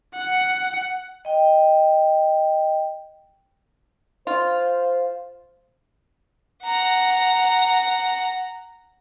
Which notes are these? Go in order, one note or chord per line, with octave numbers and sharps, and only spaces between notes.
F#5
D#5 G5
F4 C5
F#5 A#5